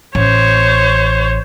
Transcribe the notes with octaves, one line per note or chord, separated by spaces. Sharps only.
A1 C5 C#5